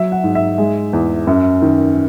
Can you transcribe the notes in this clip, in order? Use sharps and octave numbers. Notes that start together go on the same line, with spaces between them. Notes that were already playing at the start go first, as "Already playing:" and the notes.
Already playing: F#3 E5
F#5
G#2
E5
G#3
E2
F#2
D#3